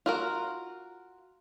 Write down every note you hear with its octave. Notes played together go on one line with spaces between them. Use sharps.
F4 F#4 A#4